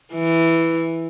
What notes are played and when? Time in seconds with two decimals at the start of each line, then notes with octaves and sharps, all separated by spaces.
0.14 E3